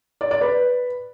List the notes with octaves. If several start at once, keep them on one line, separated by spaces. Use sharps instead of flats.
D5
D5
B4